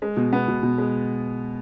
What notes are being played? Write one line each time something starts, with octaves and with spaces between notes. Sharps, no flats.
G#3
B2
B3
B2
B2
G#3